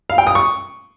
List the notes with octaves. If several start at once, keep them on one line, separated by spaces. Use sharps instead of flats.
F5
G5
D#6
C#6